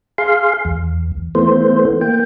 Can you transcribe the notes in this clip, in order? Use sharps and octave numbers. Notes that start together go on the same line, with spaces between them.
G#4 F5 C6
E2
E3 A3 B3 C5
A#3 G5